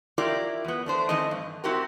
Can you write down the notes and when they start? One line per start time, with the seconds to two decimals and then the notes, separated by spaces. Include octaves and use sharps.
0.18 E4 F4 G4 A#4 D5
0.65 E2 B3
0.86 A3 D4 C5
1.09 D#3 E3 A3 C4 D#5
1.31 G2
1.64 C4 E4 F#4 G4 A#4